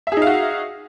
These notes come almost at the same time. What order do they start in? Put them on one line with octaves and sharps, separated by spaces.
E5 G#4 D#4 F5 F#4